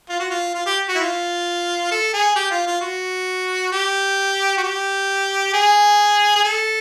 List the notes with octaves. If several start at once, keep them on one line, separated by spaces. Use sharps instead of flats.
F4
F#4
F4
F4
G4
F#4
E4
F4
A4
G#4
G4
F4
F4
F#4
G4
F#4
G4
G#4
G#4
A4